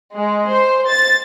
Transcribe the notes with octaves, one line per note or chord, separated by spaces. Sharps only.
G#3
C5
A6